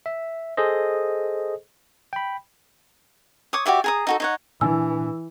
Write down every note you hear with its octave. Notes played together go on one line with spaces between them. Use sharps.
E5
G#4 A4 C5 D#5
G5 B5
C#5 D6 D#6
F#4 G4 D5 E5
G#4 A#5 D#6
D#4 F#4 A4
D#4 C#5 F#5
A#2 E3 C4 D4 G#5 E6